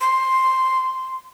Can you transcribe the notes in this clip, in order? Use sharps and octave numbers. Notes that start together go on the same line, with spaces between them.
C6